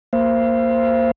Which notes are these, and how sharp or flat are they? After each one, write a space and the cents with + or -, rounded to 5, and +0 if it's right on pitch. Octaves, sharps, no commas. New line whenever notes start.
A#3 +0 C5 +0 F5 -45